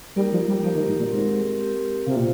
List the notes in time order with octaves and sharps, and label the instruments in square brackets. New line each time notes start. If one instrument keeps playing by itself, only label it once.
[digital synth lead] G3 [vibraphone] A#3 D#4 G4 A#4
[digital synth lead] F3
G3
[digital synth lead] F3 [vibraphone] A#3 D#4 G4 A#4
[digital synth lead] D#3
G#2
A#2
[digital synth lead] G#2 [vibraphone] C4 G4 A#4
[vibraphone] C4 G4 A#4
[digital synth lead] C3 [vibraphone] F4 C5 F5
[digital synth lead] A#2